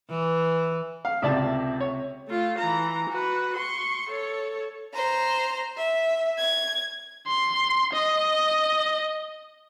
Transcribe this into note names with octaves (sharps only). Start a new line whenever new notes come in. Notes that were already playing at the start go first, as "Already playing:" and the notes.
E3
F5
C#2 C3 D5 E5 A5
C#5
A3 F4
E3 A#5
F#4 B4
C6 C#6
A4 C#5
C5 A#5
E5
G#6
C6
D#5